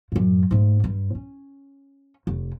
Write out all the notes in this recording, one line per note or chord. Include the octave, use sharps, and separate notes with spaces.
F#2 A2
G#2 A3
G2
C#4
F1